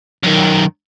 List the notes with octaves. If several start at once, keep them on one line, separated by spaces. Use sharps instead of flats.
F#2 D#3